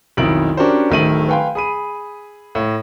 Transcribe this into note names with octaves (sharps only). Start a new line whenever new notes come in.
B1 F2 D#3 E4 D7 F#7
C#4 D4 F#4 G4 A#4 C5
D1 D#3 A3 D#7 F#7
B4 F5 G5 G#5 C6
G#4 B5 D#7
A2